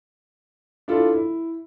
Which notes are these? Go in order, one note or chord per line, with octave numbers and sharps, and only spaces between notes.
D4 E4 F4 A4
E4